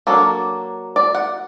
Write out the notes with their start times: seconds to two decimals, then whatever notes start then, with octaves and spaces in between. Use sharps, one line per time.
0.07 F#3 A#3 D4 A4
0.96 D5
1.15 F#5